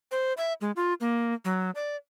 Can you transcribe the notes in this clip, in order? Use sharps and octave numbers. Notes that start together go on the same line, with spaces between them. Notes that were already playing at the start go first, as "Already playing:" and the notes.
C5
E5
G#3
F4
A#3
F#3
D5